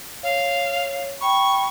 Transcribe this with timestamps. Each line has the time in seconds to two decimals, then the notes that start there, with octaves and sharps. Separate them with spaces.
0.23 C#5 F5
1.21 G5 B5 C#6